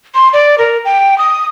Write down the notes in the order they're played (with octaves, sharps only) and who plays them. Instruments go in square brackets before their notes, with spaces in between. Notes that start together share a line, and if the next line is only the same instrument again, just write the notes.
[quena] C6
D5
A#4
G5
D#6